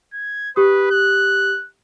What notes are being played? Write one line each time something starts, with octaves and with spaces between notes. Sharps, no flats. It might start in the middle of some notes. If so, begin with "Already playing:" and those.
G#6
G4 B4 D#6
F#6